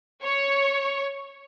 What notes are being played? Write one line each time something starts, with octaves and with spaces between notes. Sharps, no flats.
C#5